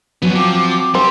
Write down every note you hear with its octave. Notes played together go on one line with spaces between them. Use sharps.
F#3 B3 C#4
F3 C4 D6
G3 C4